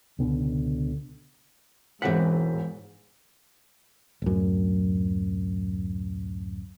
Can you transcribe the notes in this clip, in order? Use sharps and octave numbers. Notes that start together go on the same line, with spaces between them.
C#2 B2 D3
E1 G#2 E3 C4 F#5 B6
D1 F#2